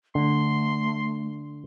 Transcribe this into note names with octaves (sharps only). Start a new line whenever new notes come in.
D3 A3 C6